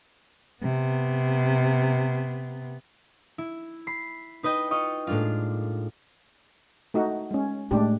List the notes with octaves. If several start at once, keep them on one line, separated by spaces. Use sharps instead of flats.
C3 B3
E4
B5 C7
D#4 B4 D#5 G5
F4 D#5 C#6
A2 G#3 A#3 D4 F4
A3 D#4 F#4
G#3 C#4
A2 G#3 D4 G4